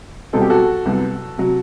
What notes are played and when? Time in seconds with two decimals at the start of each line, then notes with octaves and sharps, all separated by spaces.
0.33 C2 B2 F#3 C4 A4
0.41 G4
0.50 F#4 A4
0.85 C2 C3 F#3 B3
1.38 C3 F#3